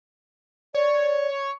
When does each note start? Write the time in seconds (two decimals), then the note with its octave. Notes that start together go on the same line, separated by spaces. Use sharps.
0.75 C#5 D5